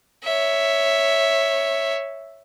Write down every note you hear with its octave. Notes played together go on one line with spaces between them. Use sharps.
C#5 E5